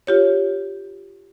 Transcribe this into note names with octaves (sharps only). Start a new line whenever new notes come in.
F4 G4 C#5